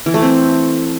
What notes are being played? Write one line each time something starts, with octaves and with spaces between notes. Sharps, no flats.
E3
A3
C4